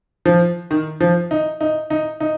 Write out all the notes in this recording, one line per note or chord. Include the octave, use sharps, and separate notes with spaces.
F3
D#3
F3
D#4
D#4
D#4
D#4